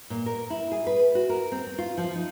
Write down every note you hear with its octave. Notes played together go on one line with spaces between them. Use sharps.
A#2
A#4
E4
G#4
B4
F#4
A#4
C4
C4
F4
F3
D#4